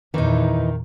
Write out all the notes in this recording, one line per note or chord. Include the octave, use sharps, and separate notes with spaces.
E2 A#2 D#3 E3 D#4